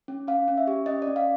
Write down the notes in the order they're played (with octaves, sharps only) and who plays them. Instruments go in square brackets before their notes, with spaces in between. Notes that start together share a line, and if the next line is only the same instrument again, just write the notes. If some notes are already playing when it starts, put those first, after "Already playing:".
[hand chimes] C#4
C#4 F5
C#4
E5
G4
C#4 D#5
D5
C#4
F5